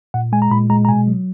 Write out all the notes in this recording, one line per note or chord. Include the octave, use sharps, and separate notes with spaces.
A#2 F#5
G#3 G#5
A#5
A#2 B5
G#3 A#5
A#5
B2 G#5
F#3